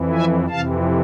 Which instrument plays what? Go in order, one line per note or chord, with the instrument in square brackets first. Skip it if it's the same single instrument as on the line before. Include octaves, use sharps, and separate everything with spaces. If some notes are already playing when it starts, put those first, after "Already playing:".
Already playing: [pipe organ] F2 E3
E5 G#5
F2 C3 E3 F5 A5